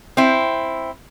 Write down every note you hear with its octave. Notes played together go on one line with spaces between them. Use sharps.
C4 E4